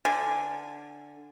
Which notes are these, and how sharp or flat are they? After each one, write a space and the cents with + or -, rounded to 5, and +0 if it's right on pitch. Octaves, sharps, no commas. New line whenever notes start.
D3 +0 G#5 -15